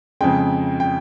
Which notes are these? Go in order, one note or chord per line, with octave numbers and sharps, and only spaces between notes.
F2 C#3 G#3 G5
G5